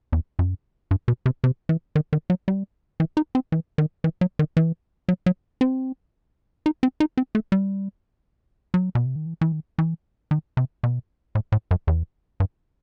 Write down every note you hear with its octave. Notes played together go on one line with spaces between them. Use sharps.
E2
F#2
G2
B2
C3
C3
E3
D#3
D#3
F#3
G3
E3
D#4
C4
E3
D#3
E3
F#3
D#3
E3
F#3
F#3
C4
D#4
C4
D#4
C4
A3
G3
F#3
B2
C3
D#3
E3
E3
D#3
E3
D#3
C3
B2
A2
A2
F#2
E2
G2